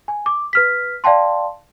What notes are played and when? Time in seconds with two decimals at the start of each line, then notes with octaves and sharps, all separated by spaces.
0.08 G#5
0.26 D6
0.53 B4 F6 B6
1.04 D5 F5 G5 A5 C6